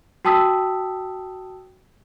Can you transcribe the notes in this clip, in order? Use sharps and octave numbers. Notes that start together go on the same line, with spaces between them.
F#4 G5 A5 D#6 E6 B6